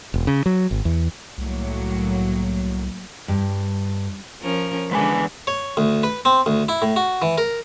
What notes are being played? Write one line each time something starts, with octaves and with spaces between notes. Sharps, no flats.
E1
C#3
F#3
G#1
E2
C2 A2 F#3 A#3
G2
F3 C#4 A#4
E2 D3 G#3 B4 G#5
C#5
D2
B4
C4
D2
E4
A2
F#4
E3
A#4